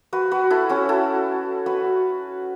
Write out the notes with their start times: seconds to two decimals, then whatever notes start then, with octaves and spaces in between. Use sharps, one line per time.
0.13 F#4 B4
0.31 F#4 B4
0.50 E4 A4
0.69 C#4 F#4
0.89 E4 A4
1.66 F#4 B4